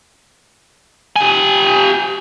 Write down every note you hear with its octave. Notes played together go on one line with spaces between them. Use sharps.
G4 G#5